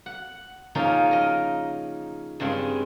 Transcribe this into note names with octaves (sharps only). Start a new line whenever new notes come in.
F#5
C#3 F3 A#3 C#4 D#4
A#4 D#5
G2 C#3 G#3 C4